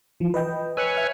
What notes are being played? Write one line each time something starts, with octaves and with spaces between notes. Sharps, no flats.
E3 F3
B4 D#5 G5
B4 C#5 G#5 E6 F#6 C#7
E5 F6